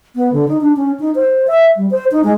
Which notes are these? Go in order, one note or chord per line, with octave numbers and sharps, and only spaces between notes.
B3
D3
D#4
D4
C#4
D#4
C5
E5
G3
C5
D#4
G#3